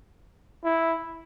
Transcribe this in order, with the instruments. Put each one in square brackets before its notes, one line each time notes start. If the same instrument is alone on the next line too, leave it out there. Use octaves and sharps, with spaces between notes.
[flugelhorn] E4